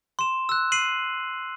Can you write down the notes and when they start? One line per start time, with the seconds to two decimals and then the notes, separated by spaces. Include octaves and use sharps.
0.19 C6 E7
0.49 E6 F#6
0.72 C7 D#7 F#7